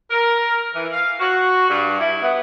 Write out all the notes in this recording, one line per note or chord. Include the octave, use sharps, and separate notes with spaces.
A#4
E3
F5
F#4
G2
E4
B3